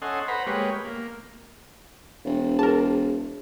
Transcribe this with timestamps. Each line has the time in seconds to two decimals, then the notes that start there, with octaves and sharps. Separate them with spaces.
0.02 C#4 A4 D#5 F#5 G#5 C6
0.28 B4 C5 F#5 A#5 B5
0.47 G#3 A#3 G4 B4 C#5
0.85 A#3
2.25 E1
2.59 E4 G#4 A#4 A5